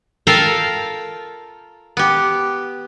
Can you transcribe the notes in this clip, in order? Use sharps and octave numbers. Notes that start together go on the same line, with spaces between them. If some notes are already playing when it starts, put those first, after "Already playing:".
F4 A4 A#4 F5 G5
B3 G4